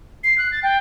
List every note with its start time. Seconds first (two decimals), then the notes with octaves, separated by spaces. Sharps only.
0.24 C7
0.38 F#6
0.52 A6
0.63 G5